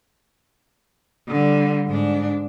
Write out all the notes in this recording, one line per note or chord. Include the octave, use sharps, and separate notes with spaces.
D3 G3
G#2 D4